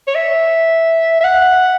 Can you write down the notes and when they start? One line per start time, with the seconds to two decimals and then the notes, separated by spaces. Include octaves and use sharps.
0.07 C#5
0.15 E5
1.21 E5
1.24 F#5